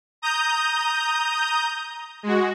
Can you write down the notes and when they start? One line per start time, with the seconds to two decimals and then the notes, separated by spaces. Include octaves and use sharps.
0.22 A#5 D#6 G6
2.23 G#3 F#4